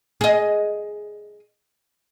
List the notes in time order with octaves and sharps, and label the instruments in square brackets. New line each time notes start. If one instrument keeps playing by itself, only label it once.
[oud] G#4 D#5